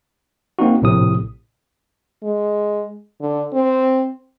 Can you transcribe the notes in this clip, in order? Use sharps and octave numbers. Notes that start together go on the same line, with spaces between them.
A#3 C4 D#4 F#4
A#1 A2 C3 D#6
G#3
D3
C4